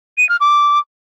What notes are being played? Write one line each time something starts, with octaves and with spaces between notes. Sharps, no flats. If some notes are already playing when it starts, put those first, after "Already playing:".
D#7
F6
D6